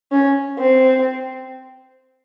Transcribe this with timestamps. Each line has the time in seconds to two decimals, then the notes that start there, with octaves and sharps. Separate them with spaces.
0.12 C#4
0.59 C4